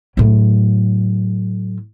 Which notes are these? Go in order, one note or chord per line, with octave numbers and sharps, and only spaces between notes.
A2 F#3